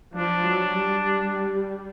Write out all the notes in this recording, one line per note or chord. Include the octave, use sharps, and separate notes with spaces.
F3 D4
F#3
G3